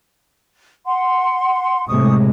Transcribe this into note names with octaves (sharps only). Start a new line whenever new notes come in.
F#5 C6
A2 C3 G#3 C#6 D#6